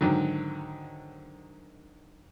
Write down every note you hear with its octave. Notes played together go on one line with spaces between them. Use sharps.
G#2 D3 D#3 F#3